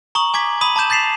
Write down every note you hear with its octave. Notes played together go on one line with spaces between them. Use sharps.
A#5 C#6 D#6 F#7
G#5 D6 G#6 B6
B5 D#6 D#7 F#7
A5 B5 D6 G6 E7
G6 A6 B6 C7 E7 F7